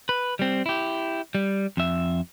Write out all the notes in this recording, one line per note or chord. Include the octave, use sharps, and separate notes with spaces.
B4
G3 C4
E4 G4
G3
F2 E5